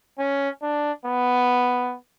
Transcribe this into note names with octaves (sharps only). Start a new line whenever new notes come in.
C#4
D4
B3